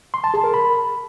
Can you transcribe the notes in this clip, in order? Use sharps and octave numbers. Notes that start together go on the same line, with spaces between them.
C6
A5
G#4
A#4
B5